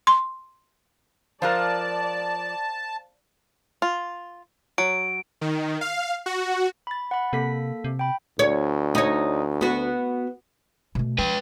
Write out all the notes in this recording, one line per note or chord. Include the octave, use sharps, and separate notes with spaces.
C6
F3 F4 A#4 C5 D5 F5 A5 F#6
F4
F#3 D7
D#3
F5
F#4
B5 A6
F#5 B5
C3 A#3 A4 B6
C3
G5 B5
D2 C#5
D#4 C#5
B3 F#4
B2 A3
F3 B4 G5